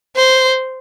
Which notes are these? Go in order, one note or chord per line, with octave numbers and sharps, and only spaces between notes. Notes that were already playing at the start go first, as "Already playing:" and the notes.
C5